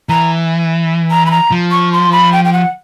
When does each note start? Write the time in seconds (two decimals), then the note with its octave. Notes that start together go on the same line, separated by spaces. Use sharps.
0.09 E3 A#5
1.11 A#5
1.26 B5
1.31 A#5
1.52 F3
1.71 C#6
1.93 C6
2.12 B5
2.33 G5
2.45 G5
2.53 F#5